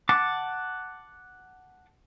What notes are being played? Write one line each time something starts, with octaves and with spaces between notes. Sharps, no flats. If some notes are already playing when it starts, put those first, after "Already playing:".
F#5 A5 D6